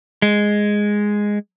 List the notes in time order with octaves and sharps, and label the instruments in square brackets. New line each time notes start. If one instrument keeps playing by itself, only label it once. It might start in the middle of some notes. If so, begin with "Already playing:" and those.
[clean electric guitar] G#3